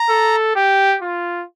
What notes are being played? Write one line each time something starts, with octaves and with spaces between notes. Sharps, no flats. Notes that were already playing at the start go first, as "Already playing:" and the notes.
Already playing: A#5
A4
G4
F4